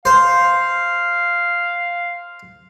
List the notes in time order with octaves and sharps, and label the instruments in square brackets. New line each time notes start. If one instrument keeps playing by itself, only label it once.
[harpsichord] C5 [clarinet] F5